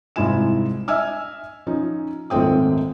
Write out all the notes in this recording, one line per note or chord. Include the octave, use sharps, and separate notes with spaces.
C2 G#2 E4 F4 G#5 E7
D#5 E5 G#5 E6 F6
F3 C#4 D#4
D#1 G#1 A3 C4 G5 D#6